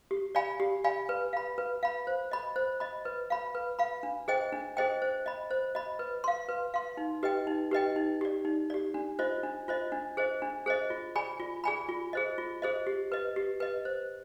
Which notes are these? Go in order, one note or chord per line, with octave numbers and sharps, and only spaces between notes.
G4
D5 F5 G#5 B5
G4
D5 F5 G#5 B5
B4
F5 B5
B4
F5 B5
C5
D#5 B5
C5
D#5 B5
B4
F5 B5
B4
F5 B5
D4
G#4 C5 D#5 G5
D4
G#4 C5 D#5 G5
C5
D#5 B5
C5
D#5 B5
B4
F5 C6
B4
F5 C6
D#4
G4 B4 D#5 G5
D#4
G4 B4 D#5 G5
D#4
G4 D5
D#4
G4 D5
D4
F4 C5 D#5
D4
F4 C5 D#5
D4
G#4 C5 D#5
D4
G#4 C5 D#5
F4
G#4 D5 G#5 B5
F4
G#4 D5 G#5 B5
F4
G#4 C5 D#5
F4
G#4 C5 D#5
G4
B4 D#5
G4
B4 D#5
C5